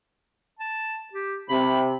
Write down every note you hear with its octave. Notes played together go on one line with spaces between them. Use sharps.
A5
G4
C3 B5